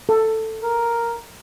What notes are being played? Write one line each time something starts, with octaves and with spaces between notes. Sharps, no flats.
A4
A#4